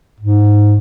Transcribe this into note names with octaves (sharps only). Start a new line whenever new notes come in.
G#2